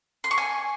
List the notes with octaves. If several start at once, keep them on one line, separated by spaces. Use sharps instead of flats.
C6
C#6
G#5